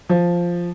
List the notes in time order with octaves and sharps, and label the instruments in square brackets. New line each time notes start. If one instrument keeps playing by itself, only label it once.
[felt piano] F3